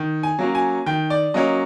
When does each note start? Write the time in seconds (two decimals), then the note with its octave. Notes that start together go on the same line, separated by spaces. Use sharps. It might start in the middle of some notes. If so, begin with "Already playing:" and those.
Already playing: D#3
0.23 G#5
0.39 F#3 A#3 C#4
0.55 G#5
0.86 D#3 G5
1.10 D5
1.34 F#3 A#3 C#4 D#5